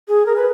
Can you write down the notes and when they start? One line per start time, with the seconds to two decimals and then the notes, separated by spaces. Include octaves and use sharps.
0.08 G#4
0.26 A#4
0.36 B4